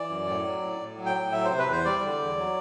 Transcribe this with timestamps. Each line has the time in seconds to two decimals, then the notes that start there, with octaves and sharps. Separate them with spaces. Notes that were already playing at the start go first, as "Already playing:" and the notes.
Already playing: E3 D5
0.09 F#2
0.27 A2
0.45 F#3
0.62 A2
0.80 A2
0.97 F#3
1.06 G5
1.15 A2
1.32 F#3 E5
1.45 C5
1.50 C3
1.58 B4
1.66 E2
1.72 C5
1.85 G3 D5
2.03 D3
2.19 E2
2.37 F#3